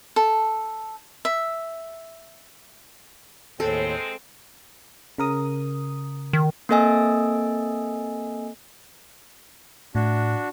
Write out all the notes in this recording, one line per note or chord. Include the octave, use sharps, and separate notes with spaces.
A4
E5
D#2 A2 G#3 C4 A4 G5
C#3 A#4 D#6
D#3
A#3 C4 A4 D#5 G#5 E6
A2 D4 F#4